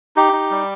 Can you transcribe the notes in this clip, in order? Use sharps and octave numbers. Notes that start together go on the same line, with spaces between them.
D#4 G4
D#4
G3